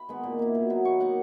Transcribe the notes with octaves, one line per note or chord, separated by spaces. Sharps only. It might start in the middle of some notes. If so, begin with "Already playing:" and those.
Already playing: B5
D#3 G#3 B3
A#2
A#3 E4
B2
F#3 B3
D#3 C#6
A#3 D#4 F#5